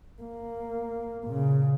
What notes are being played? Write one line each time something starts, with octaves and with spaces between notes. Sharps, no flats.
A#3
A#2 C#3